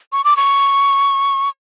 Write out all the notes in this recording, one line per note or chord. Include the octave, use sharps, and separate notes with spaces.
C#6
D6
C#6